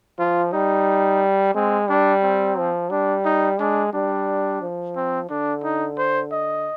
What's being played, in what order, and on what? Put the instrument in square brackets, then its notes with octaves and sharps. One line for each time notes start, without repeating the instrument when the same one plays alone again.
[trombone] F3 [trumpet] F4
[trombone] G3 [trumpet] D#4
[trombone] G#3 [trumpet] C4
[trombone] G3 [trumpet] D4
[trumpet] C4
[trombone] F3
[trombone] G3 [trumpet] D4
[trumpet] D#4
[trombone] G#3 [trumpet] D4
[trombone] G3 [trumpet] D4
[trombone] F3
[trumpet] C4
[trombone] D3 [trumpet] D4
[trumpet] D#4
C5
D#5